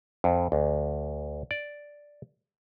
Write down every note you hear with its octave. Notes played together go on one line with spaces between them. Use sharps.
F2
D2
D5